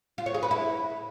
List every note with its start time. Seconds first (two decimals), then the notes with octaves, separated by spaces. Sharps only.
0.18 F4
0.26 C#5
0.34 G#4
0.43 B4
0.51 E4